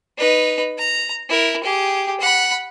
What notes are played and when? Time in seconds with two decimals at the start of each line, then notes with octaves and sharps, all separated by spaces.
0.18 D#4 B4
0.78 A#5
1.29 E4 A#4
1.64 G4 G#4
2.20 F#5 B5